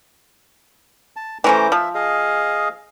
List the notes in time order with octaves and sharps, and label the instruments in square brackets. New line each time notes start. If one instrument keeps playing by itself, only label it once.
[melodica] A5
[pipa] E3 C#4 C5 [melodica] A3 A#5 D6
[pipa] F3 [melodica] E5
[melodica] G#4 D#5 F5